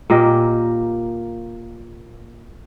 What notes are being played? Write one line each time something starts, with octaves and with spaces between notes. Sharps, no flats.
A#2 A#3 G4 D#5